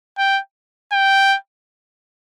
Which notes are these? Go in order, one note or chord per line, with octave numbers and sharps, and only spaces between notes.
G5
G5